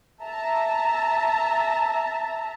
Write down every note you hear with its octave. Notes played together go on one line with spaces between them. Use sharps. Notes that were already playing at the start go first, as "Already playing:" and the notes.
E5 A5 A#5